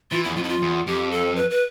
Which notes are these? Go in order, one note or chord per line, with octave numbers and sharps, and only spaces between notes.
E3 F4
E2 E4
F2 F4
E4
F4
E2
F2 G4
A4
B4
B4